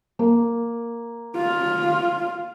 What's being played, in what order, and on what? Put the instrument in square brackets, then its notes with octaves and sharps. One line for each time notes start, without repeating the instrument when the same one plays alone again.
[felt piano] A#3
[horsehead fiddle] F4